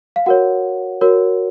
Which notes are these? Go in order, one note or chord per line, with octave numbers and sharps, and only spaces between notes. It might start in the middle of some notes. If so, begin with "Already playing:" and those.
F5
F#4 A#4 C#5 F#5
F#4 A#4 C#5